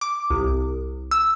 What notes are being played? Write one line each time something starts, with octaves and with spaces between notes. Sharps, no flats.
D6
C2
E6